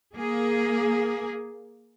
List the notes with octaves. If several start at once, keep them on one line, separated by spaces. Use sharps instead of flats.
A#3 G#4